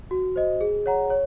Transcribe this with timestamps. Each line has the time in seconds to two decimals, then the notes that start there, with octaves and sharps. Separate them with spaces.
0.11 F#4
0.36 C5 D#5
0.61 G#4
0.86 C#5 F#5 A#5
1.10 C#5